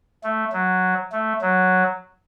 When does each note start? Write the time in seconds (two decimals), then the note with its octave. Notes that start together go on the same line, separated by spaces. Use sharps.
0.23 A3
0.53 F#3
1.12 A3
1.42 F#3